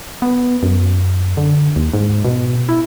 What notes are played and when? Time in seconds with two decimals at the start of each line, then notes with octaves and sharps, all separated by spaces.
0.22 B3
0.63 F#2
1.37 D3
1.76 D#2
1.94 G#2
2.25 B2
2.69 E4